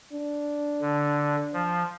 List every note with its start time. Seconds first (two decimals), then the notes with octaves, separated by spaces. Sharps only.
0.12 D4
0.81 D3
1.53 F3